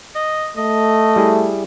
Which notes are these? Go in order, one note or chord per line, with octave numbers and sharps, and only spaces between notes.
D#5
A3 D#5
G3 E4 G#4